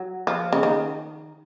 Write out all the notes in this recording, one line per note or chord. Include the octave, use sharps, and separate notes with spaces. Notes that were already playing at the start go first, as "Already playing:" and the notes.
Already playing: F#3
F3
C#3
D#3